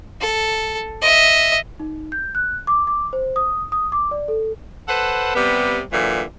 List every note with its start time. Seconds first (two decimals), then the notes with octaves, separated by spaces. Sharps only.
0.21 A4
1.02 D#5 E5
1.80 D#4
2.12 G6
2.35 F#6
2.67 D6
2.87 D6
3.13 C5
3.36 D#6
3.72 D#6
3.92 D6
4.11 D5
4.28 A4
4.87 A4 B4 C5 F#5
5.34 C3 G3 B3
5.91 A#2 D3 E3 F#3